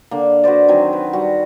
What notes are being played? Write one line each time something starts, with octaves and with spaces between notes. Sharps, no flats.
D3 A#3
F#4 B4 C5 D5
D#3 F#3 C4 G#5
B4
G3 F#4